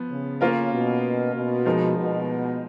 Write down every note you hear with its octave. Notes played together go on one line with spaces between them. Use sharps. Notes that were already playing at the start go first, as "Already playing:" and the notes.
Already playing: F3 B3
C#3
A#3 C#4 F4 A#4
B2
B2
F3 G#3 D#4 A#4
B2